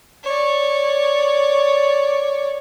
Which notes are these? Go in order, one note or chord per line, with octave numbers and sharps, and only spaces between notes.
C#5 D5